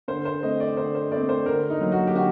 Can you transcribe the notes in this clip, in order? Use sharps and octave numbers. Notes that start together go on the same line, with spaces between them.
D3 C5
C5
A3 C4 D#5
D5
D3 C5
C5
A3 C4 D5
C5
D3 A#4
D#4
F#3 A#3
F#4
G4
D3 F#4